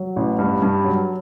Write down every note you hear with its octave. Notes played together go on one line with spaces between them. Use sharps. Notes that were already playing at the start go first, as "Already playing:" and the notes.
Already playing: F#3
A1
G2
G2
F#3